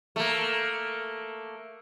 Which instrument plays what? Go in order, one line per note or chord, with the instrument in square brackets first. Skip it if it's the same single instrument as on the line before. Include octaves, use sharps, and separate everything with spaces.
[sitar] A3 A#3